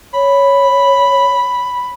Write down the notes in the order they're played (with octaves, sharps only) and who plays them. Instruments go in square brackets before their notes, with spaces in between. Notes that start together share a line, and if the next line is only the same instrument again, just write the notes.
[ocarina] C#5 [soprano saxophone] B5